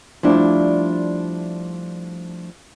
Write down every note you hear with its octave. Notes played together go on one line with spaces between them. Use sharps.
F3 G3 A3 D4 E4